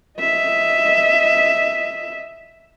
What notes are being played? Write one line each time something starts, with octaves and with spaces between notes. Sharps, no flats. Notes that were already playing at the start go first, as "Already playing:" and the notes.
D#5 E5